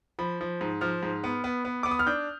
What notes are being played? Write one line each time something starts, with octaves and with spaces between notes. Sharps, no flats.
F3 B5
F3
G#2
F3 F6
G#2
B3
B3
B3
B3 D6
D#6
F6
D4 G6